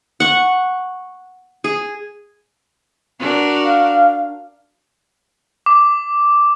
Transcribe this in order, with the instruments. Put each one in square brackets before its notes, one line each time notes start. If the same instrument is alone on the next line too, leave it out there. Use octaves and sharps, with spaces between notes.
[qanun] F#5 C#6
G#4
[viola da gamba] D4 F#4 A#4
[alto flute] F5
[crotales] D6